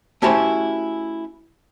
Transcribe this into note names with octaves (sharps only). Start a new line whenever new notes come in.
A3 C#4 E4 F#4 G4 C5